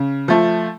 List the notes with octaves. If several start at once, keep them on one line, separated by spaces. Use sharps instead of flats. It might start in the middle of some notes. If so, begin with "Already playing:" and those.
Already playing: C#3
F3 A3